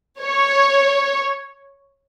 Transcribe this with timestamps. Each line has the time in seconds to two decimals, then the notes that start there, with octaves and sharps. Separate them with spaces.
0.21 C#5